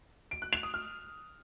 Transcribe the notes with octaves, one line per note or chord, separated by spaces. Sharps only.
D7
F#6
F7
D#6
F6